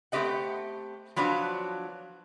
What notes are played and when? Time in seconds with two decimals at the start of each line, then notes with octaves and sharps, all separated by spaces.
0.12 A3 B3 C4 G4 D#5 F#5
1.16 F3 F#3 B3 D4 F4 C#5